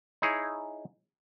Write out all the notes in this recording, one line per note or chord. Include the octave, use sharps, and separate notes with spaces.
D#4 E4 G#4 C#5